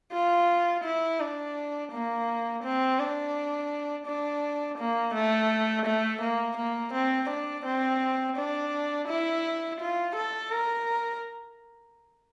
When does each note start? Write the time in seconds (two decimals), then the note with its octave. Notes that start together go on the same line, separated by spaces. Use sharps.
0.13 F4
0.84 E4
1.20 D4
1.92 A#3
2.63 C4
2.99 D4
4.07 D4
4.78 A#3
5.14 A3
5.86 A3
6.21 A#3
6.57 A#3
6.93 C4
7.29 D4
7.65 C4
8.37 D4
9.08 E4
9.80 F4
10.16 A4
10.51 A#4